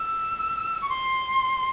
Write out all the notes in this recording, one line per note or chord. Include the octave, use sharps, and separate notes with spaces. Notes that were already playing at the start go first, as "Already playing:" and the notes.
Already playing: E6
C#6
C6